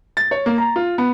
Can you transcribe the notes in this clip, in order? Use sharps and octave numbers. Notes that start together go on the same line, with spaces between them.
A6
C#5
A#3
A#5
F4
B3